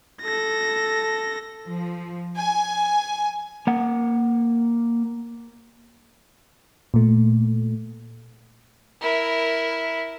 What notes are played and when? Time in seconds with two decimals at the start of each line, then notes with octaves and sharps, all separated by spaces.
0.22 A4 A#6
1.65 F3
2.37 G#5
3.67 A#3 F#5
6.94 A#2 A3
9.01 E4 A#4